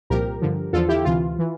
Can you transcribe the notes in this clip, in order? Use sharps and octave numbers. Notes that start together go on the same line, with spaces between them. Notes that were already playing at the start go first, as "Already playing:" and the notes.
C2 A#2 F3 G4 A#4
G2 D3 F3
E2 D3 F3 F4 A4
E4 G4
D2 C3 E3 F4
E3